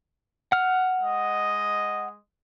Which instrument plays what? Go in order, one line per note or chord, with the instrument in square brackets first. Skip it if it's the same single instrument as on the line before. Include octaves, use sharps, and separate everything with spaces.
[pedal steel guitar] F#5 F6
[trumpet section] G#3 D#5